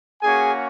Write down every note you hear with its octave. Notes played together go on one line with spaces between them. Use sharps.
A#3 C#4 F#4 G#4 G#5